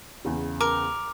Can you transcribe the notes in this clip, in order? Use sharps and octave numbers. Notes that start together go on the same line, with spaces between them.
E2 C#3
A#4 D6